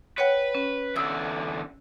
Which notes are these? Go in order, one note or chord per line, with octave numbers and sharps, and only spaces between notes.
B4 C#5 F#5 G5
C#4
E2 D3 D#6 E6